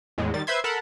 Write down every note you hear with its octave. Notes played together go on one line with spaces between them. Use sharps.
E2 A2 G#3
D#3 G3 A6
B4 C5 E5 C6 G#6
A4 A#4 F#5 A5 B5